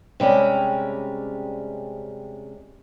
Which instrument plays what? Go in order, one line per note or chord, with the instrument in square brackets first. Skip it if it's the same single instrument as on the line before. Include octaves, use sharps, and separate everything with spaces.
[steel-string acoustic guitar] C3 G3 G#3 C#4